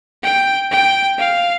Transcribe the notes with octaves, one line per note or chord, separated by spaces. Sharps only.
G5
G5
F5